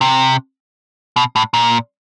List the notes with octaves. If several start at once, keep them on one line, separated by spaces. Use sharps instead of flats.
C3
B2
A2
A#2